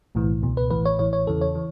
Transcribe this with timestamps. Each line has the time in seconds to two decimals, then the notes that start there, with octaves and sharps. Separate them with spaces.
0.15 B1 A2 E3
0.42 C#2 B2
0.57 B4
0.70 A1 A2 E3 B4
0.85 C#5
0.99 A1 A2 E3 C#5
1.13 C#5
1.27 E2 C#3 E3 A4
1.41 C#5
1.55 E3